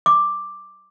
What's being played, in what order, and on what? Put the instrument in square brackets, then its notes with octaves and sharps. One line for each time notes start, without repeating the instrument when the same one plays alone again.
[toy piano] D6